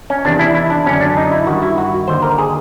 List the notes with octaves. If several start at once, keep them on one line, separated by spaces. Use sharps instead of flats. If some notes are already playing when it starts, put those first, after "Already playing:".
C#4
E2 C3 D#3 D4
E4
E4
D4
F#2 D3 C#4
D4
D#4
E4
G2 D#3 F#4
E4
F#4
D#2 D3 C5
A#4
G#4